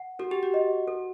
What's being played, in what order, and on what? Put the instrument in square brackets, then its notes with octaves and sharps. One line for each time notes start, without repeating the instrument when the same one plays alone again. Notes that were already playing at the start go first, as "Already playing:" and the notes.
Already playing: [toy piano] F#5
[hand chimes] F#4 [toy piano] A4
[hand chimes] G4
F#4
[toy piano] D#5
A4